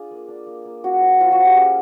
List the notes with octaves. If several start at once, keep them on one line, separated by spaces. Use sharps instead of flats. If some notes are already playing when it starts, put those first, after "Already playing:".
Already playing: D4 F4 G#4
A#3
D4
A#3
A#3
C#4 F#4
F3
F3 F4
F#4
F3
G4
C#4 G#4